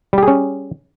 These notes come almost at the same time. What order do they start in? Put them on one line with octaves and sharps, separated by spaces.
G3 G4 G#4 C#4